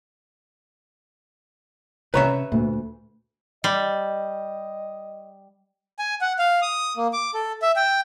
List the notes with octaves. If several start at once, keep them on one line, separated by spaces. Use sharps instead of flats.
C3 C#4 B4 C#5 E5 A#5
D2 A#2
G3 D#5
G#5
F#5
F5
D#6
A#3
D6
A4
E5
G5